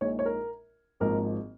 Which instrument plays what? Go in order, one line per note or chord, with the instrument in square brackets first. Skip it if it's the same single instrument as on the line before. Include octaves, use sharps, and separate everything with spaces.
[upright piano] A#1 A#2 G#3 D#4 C#5
C#5
A#4
G#1 G#2 F3 A#3 A#4